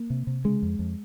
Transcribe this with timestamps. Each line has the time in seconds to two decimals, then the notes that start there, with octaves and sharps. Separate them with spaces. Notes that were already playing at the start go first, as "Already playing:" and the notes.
Already playing: A#3
0.10 C3
0.27 C3
0.44 C#3 G#3
0.63 F2
0.79 F2